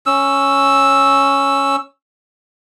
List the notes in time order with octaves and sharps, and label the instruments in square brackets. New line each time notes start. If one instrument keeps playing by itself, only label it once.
[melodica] C#4 E6